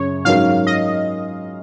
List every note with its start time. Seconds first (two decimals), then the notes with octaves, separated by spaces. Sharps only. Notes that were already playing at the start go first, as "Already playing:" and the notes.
Already playing: F#2 C#3 C#5
0.25 G#2 F#3 C#4 F#4 A#4 F5
0.67 D#5